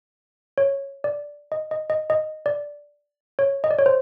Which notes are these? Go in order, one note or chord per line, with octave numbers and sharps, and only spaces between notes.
C#5
D5
D#5
D#5
D#5
D#5
D5
C#5
D#5
D5
C#5
C5